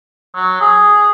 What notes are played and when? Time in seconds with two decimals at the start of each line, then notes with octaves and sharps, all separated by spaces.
0.35 F#3
0.61 G#4